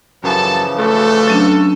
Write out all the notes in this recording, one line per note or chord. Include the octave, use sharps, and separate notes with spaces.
F#2 C#3 E3 F3 A4 A5
A3 F4 F#4 A4
F#3 C#4 D4